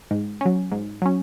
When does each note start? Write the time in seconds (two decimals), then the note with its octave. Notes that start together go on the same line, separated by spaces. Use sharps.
0.11 G#2
0.41 F#3 C#4
0.72 G#2
1.02 F#3 C#4